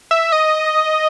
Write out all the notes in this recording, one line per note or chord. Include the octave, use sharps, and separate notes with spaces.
E5
D#5